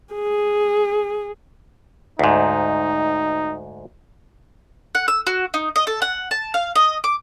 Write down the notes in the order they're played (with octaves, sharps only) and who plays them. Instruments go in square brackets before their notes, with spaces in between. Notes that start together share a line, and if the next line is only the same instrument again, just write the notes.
[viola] G#4
[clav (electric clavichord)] D2 G#2 [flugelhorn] D#4
[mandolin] F#5
E6
F#4
D#4
D#5
A4
F#5
A5
F5
D#5
D6